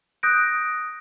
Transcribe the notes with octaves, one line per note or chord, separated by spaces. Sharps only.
D#6 F#6 G6 A#6 D7